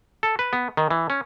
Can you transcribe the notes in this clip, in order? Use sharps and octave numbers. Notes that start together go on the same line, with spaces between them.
A4
B4
B3
D#3
E3
C#4